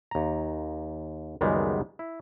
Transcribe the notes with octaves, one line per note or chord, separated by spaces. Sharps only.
D#2 A#5
C#2 F#2 D#3 G3 G#3 B3
E4